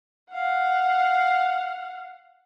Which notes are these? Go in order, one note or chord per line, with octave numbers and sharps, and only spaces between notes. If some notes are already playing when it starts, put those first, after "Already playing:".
F5 F#5